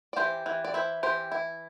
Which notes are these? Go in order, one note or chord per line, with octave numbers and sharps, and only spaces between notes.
D5
E3 G4 C5
E3
D5
E4 C5 E5
E3 G4 C5
E4